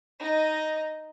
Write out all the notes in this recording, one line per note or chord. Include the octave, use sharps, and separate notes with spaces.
D#4 D#5